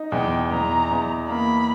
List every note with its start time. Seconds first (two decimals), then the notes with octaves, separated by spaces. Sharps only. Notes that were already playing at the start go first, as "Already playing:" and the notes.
Already playing: D#4
0.12 E2 G5
0.51 E2 A#5
0.91 E2
1.30 A#3 B5